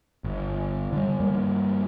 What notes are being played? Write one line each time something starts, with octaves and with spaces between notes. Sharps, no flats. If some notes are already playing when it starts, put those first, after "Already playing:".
G1
D3 G3
G2 G3 A#3